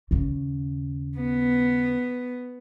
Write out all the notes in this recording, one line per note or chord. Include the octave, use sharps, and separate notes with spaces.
D#2 C#3
B3